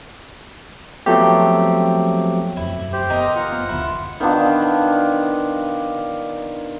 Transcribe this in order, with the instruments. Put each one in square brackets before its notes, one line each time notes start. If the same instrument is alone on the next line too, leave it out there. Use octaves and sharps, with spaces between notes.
[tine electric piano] F3 F#3 A3 B3 C4 G4
[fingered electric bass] E1 F#2 [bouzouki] E4
[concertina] G4 C5
[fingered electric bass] F#1 B2 B3 [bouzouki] D#4 A#4
[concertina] F4 F#5
[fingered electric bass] B3
[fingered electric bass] F#1 D2 [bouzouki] E4
[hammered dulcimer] D#3 B3 D4 F4